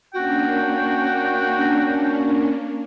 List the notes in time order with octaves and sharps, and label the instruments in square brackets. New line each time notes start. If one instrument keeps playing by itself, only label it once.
[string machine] A#3 C#4 D4 [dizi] F#4 [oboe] G5